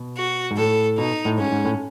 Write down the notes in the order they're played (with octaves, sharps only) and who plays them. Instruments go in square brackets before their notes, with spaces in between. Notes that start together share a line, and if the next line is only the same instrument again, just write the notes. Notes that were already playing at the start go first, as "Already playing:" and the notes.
Already playing: [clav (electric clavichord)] B2
[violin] F#4
[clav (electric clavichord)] G#2
[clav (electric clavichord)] A2 [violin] A4
[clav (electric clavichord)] B2 [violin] D#4
[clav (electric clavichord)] A2
[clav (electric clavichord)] G#2 [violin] C#4
[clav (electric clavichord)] G#2
A2